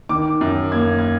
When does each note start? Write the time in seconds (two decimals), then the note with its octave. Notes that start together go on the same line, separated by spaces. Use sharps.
0.09 D#3 D6
0.41 F#2
0.72 A#3 G#6
0.99 G#6